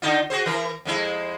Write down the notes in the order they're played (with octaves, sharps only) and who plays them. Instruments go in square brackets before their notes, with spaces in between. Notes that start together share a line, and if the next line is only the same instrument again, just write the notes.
[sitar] D3 D#4 F4
F#4 G#4 C5
E3 A#4
F2 G#3 E4